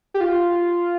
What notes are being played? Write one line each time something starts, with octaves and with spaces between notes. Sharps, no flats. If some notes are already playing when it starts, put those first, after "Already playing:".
G4
F4